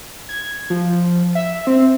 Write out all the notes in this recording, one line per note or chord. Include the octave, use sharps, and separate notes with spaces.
G#6
F3
E5
C4